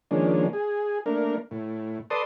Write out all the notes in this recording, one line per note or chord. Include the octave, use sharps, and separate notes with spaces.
D#3 F3 G#3 A#3 C#4 D4
G#4
A3 A#3 D4 A#4
A2
A4 B4 D5 A5 C6 D#6